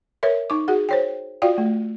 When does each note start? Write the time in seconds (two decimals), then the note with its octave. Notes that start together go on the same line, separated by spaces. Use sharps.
0.23 A#4 B4 C#5 E5
0.50 D#4 D6
0.68 F#4 G#4 F#5
0.89 C5 C#5 G5
1.42 F4 F#4 D5 F5 G5
1.58 A3